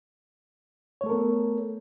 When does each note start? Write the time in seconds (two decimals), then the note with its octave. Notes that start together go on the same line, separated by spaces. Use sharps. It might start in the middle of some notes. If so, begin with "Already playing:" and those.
1.01 C#5
1.04 A3
1.06 A4
1.09 A#4
1.12 B3